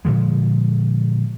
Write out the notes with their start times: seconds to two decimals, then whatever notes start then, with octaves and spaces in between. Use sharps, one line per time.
0.05 A#2 D3 F3 G#3